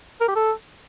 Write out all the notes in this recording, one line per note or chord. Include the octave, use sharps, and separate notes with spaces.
A#4
G4
A4